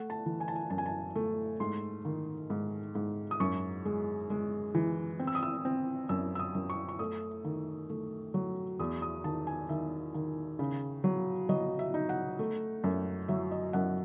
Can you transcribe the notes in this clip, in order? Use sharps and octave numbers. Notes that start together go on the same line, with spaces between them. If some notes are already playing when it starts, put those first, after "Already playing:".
Already playing: A3 F#5
A5
E3
G#5
A5
G#5
F#2 A5
G#5
A5
A3
G#2 C6
D#3
G#2
G#2
D#6
F#2 C#6
G#3
G#3
E3
C4
E6
D#6
E6
C4
F#2 E6
E6
D#6
F#2
C#6
C#6
A3 D#6
D#3
A3
F#3
E2 D#6
D#6
D#3 A5
G#5
D#3 E5
D#3
C#3
F#3
F#3 D#5
E5
D#4
F#5
A3
F#2
F#3 E5
D#5
F#2 F#5